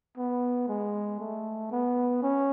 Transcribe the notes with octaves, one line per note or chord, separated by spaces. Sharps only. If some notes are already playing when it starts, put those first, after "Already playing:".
B3
G#3
A3
B3
C#4